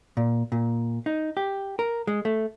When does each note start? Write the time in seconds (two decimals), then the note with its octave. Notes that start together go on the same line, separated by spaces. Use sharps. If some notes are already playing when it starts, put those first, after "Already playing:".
0.17 A#2
0.52 A#2
1.06 D#4
1.37 G4
1.79 A#4
2.07 G#3
2.25 A3